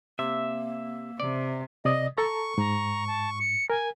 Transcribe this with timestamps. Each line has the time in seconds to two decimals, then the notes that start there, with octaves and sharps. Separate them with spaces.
0.19 C3 A#3 E5
1.20 C3 D5
1.85 C3 D5 D#5 D#6
2.18 A4 A5 A#5 C#6
2.58 G#2 A#5
3.07 A5
3.39 C#7
3.70 A#4 G#5